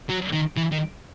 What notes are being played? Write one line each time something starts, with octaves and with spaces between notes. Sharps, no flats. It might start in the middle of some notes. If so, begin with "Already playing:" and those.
F#3
D#3
E3
D#3